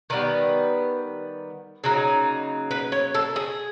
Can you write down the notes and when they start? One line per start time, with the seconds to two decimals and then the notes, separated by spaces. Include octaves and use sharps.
0.10 D#3 G3 B3 B4
1.84 C#3 F#3 A#3 D#4
2.71 B4
2.92 C#5
3.15 A4
3.36 G#4